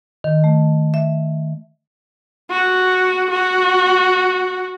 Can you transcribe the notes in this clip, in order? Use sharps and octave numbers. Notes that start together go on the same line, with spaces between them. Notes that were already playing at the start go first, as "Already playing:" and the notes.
D#3
A3
E5
F#4
F#4